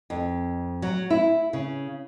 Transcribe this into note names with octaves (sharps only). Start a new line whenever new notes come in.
F2
F#3
E4
C#3